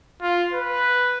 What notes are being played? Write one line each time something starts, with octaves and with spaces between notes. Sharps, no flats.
F4
B4